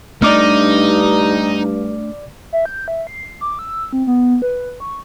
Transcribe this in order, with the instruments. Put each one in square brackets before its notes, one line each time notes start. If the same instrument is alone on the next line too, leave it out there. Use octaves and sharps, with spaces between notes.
[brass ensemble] G2 [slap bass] A3 D4 [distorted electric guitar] D#4 [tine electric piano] D5 D6 F6
[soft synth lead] E5
G6
E5
C7
D6
E6
C4
B3
B4
C#6